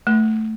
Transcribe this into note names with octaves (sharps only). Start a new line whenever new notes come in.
A3